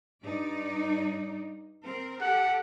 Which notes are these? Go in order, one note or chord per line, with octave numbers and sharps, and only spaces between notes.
G2 D#4 D5
C4 A#4
G4 A4 F#5